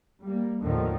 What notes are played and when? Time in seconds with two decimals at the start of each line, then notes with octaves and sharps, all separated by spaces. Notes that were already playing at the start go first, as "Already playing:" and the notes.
0.23 G3 A#3
0.60 D#2 A2 D3 D#3 F3